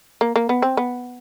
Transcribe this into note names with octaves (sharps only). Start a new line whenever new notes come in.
A#3
A#3
B3
C4
B3